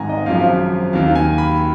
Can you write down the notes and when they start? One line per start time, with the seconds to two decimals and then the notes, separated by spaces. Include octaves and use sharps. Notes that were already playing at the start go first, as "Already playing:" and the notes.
Already playing: G#1 G#2 D#3 F#5 G#5 A#5
0.09 D#5
0.26 G#1 F#2 F3 F5
0.93 D#2 D#3 F5
1.15 G#5
1.38 B5